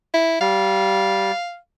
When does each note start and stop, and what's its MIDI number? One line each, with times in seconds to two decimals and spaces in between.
0.14 0.38 64
0.41 1.31 55
0.41 1.57 77